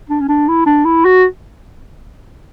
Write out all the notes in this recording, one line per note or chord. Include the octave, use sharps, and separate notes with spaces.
D4
C#4
D4
E4
D4
E4
F#4